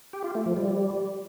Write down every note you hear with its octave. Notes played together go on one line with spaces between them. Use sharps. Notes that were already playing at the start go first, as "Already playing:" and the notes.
G4
F4
A3
F3
G3